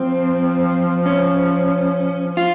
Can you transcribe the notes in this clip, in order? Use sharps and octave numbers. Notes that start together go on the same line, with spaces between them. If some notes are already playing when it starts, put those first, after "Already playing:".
Already playing: F3 C4
C#4
F4